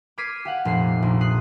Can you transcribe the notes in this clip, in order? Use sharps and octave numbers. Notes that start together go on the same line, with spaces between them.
D6 F6 G#6 B6 C7 D#7
G4 F5 F#5
F1 A#2 C7
A#1
D#6 F#6 C7